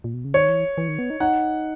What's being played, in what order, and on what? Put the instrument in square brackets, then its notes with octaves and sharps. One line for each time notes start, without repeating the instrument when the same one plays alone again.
[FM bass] A#2
B2
C#3
[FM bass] D#3 [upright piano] C#5
[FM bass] E3
E3
D#3
B3
D#4
[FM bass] D#4 [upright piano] F#5